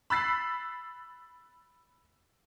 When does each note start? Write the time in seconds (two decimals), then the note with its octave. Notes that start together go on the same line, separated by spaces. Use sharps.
0.10 B5 E6 F#6 A6 B6 C7